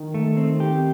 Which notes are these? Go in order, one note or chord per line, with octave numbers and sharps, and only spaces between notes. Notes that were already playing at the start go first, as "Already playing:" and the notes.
Already playing: D#3
A3
C4
G4